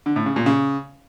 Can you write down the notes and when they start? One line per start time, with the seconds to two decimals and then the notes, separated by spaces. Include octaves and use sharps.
0.06 D3
0.16 A2
0.26 C#3
0.36 A#2
0.46 C#3